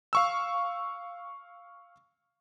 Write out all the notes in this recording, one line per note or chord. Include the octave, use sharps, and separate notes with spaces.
F5 C#6 E6